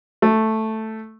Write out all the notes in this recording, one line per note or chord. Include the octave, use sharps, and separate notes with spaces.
A3